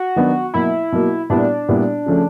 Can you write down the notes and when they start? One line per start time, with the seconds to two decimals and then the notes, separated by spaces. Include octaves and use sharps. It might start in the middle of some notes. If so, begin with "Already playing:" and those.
Already playing: F#4
0.16 D#3 F#3 B3 D4
0.54 B2 F#3 A#3 E4
0.92 B2 F#3 A#3
1.30 A#2 G3 B3 D4 E4
1.69 A#2 G3 B3 E4
2.06 C#3 F3 A3 C#4